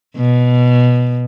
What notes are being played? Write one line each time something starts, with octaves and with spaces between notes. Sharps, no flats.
B2